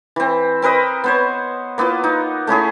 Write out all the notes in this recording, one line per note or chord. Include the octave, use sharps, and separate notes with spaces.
E3 C4
C4 A#4 B4 D#5
B3 C5 C#5
A#3 B3 E4 F4
D#4
A3 C#4 E4 G#4